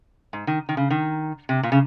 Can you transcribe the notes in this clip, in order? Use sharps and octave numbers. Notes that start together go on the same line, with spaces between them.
G#2
D#3
D#3
C#3
D#3
C3
A#2
C#3